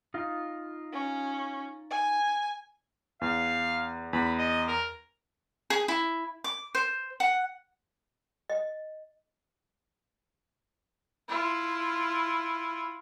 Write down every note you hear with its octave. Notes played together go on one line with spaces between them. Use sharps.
D#4 F4
C#4
G#5
E2 F5
E2 B5
D#5
A#4
G#4
E4
D6
C5
F#5
D#5
E4 F4